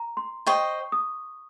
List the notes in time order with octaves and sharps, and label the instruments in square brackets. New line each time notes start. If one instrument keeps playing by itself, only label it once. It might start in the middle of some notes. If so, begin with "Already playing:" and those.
Already playing: [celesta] A#5
C6
[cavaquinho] C5 D#5 G5 [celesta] C#6
[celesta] D#6